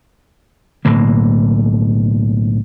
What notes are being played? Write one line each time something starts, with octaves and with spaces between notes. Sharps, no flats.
B1 A2 D3 A#3